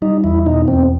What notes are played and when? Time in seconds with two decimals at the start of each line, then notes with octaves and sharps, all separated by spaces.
0.02 G3 D#4
0.24 E2 E4
0.46 B2 D#4
0.68 E2 C4